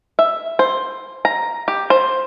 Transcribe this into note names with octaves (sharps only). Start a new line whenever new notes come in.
E5
C5
A#5
G4
C5